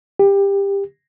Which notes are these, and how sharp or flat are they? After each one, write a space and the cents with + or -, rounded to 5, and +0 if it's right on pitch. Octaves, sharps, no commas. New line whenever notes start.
G4 +20